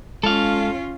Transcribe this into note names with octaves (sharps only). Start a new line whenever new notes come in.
G#3 C#4 F4 A4 F5